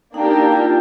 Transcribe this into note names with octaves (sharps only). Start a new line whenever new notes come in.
A#3 D4 D#4 G4
E4
F4